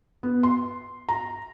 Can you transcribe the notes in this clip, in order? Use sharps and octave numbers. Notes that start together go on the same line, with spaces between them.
B3
C6
A#5